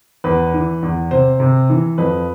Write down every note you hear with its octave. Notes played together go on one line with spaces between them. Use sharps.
E2 B4
E3
E2
C3 C5
C3
E3
F2 B4